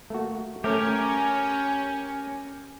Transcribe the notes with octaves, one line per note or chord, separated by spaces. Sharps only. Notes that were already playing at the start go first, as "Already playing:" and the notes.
A3 A#3 F#4
A3 C#4 G4 A#4